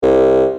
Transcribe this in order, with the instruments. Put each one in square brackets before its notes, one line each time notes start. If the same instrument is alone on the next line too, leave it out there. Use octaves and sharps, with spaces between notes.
[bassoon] C2